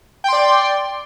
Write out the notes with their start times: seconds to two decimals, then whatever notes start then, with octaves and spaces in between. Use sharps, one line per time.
0.24 G5
0.28 C6
0.33 D5